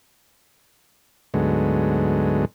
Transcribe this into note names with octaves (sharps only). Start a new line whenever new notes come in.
D2 G#2 D3 F#3 G#3 B3